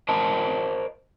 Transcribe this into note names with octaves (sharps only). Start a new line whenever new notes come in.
A#4 C5 D#5 A5